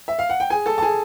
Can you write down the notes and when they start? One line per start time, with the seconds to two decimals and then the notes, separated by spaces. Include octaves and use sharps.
0.08 E5
0.19 F5
0.29 F#5
0.40 G5
0.50 G#4 G#5
0.66 A4 A5
0.78 A5
0.82 G#4 G#5